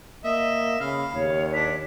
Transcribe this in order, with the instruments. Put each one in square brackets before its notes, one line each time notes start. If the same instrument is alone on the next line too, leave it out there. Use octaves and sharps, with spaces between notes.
[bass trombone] A#3 [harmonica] D#5 E5
[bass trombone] C#3 [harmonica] F5 [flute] B5
[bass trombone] D#2 [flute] C#5
[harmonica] D4 [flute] B6